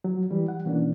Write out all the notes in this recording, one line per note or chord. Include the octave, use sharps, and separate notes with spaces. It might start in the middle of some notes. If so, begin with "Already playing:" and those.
F#3
E3 G3 G4
F#5
B2 E3 A#3 C#4 D4